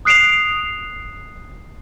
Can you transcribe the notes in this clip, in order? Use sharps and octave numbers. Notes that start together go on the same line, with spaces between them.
D#6 F#6 C7 D7 E7 F7